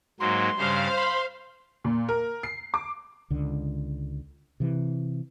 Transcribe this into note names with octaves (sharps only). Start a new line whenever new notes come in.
G#2 F#3 A#3 C6
G2 C#3 G3 C5 F5
B5 C6
A#2
A#4
C7
D6
C#2 D3
C3 E3